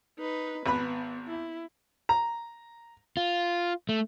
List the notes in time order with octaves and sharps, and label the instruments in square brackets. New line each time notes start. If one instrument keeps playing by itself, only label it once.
[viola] D#4 B4
[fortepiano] G#1 B4 B5 [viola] B3
[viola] E4
[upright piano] A#5
[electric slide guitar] F4
A3